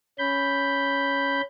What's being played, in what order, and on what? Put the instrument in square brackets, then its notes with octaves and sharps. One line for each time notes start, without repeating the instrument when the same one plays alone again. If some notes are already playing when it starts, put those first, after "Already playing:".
[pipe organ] C#4 B5 G6